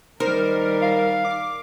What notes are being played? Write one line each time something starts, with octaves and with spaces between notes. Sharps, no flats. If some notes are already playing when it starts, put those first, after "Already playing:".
D#3 G3 D#4 A#4 C5
F5
D6